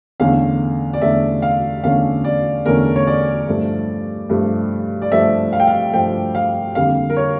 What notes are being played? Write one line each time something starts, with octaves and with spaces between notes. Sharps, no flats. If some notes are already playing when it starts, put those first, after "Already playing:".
E2 D3 A3 C#4 F5
D5
E2 D3 A3 C#4 E5
F5
E2 D3 A3 C#4 F5
D5
E2 D3 A3 C#4 A#4
C#5
D5
G2 F3 A3
G2 F3 A3
D5
G2 F3 A3 E5
F5
G5
F5
G2 F3 A3 G5
F5
F2 D3 G3 A#3 F5
A#4
C#5